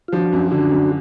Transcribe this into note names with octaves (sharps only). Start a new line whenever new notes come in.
F4
F3 D4 F#4
F#2
D3 D4 F#4
F#2